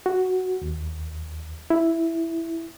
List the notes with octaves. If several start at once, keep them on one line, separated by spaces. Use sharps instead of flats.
F#4
D#2
E4